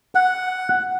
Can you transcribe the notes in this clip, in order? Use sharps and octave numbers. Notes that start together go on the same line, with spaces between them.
F#5